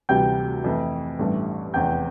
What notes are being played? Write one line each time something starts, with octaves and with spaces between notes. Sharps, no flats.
D2 C3 E3 G3 G5 G6
F2 E3 A3
A1 G2 E3 A3
F1 E2 E3 G5 G6